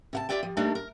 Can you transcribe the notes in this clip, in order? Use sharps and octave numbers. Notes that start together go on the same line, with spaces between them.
C3 F5 A5
F4 G4 D5 E5 G5
F3
G3 A3 A#3 C4 D4 D#4
A#4